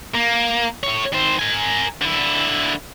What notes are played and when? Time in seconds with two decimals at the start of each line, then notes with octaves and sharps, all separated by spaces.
0.14 A#3
0.83 A2 C#5
1.12 D#3 C5
1.39 A#4 G#5
2.02 D3 E4